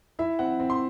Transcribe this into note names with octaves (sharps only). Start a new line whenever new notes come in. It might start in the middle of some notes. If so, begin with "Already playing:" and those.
E4 E5
C4 F#5
C4
C6